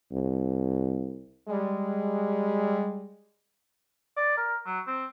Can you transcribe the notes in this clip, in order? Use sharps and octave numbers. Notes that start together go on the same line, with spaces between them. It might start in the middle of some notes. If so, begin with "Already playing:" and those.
C2
G3 G#3
D5
A#4
F#3
C4